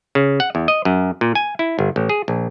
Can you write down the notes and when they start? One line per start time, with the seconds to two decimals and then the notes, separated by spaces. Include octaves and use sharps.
0.15 C#3
0.40 F#5
0.55 E2
0.68 D#5
0.85 F#2
1.21 A#2
1.35 G#5
1.59 E4
1.79 G1
1.96 A1
2.09 G#4
2.28 A#1